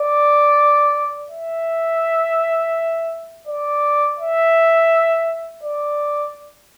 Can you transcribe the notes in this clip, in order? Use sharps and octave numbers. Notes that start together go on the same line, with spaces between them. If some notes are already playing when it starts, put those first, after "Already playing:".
Already playing: D5
E5
D5
E5
D5